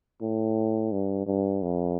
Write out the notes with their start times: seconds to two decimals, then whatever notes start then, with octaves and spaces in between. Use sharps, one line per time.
0.21 A2
0.92 G2
1.26 G2
1.62 F2